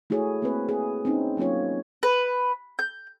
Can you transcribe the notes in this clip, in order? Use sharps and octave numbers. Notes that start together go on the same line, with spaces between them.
A3 E4 F#4 G#4 C#5
A#3 C4 B4
G#4
C4 C#4 D#4
F#3 A#3 C#4 F4 C#5
B4
G6